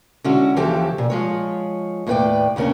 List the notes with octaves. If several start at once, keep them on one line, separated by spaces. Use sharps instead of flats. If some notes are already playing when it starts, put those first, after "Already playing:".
D3 G#3 C#4 E4 F#4
D#2 C#3 E3 F3 G4 A4
A#2
F3 G#3 C#5
D#2 A2 B3 B4 D5 G5
D#2 C#3 C#4 D4 A#4